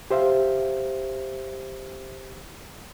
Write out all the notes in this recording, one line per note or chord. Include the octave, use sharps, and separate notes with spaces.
G4 C5 E5 F5